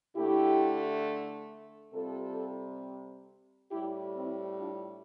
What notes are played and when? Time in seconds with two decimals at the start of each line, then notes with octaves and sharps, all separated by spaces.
0.16 D3 A3 E4 G4
1.94 C3 G3 F4 A4
3.72 A2 G3 E4 G4
4.16 C4 E4
4.60 D4 F4